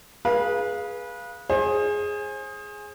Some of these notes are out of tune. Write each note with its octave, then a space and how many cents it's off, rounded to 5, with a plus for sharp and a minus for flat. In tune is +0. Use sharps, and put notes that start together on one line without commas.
G#4 +0 B4 -25 F5 +0
G#4 +0 C5 +35